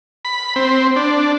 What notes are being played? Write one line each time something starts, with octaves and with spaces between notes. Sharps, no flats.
B5
C4
D4